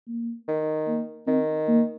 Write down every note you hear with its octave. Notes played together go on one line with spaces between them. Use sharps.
A#3
D#3
A#3
D#3 C4
A#3